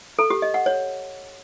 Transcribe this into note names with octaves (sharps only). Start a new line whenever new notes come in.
A4
G4
D#5
F#5
C#5